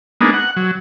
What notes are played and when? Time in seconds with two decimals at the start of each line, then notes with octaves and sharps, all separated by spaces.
0.21 G#3 A#3 B3 D4 D#4
0.33 F#5
0.57 F#3